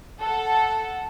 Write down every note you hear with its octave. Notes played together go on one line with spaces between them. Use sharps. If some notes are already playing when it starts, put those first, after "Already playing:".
A4 F#5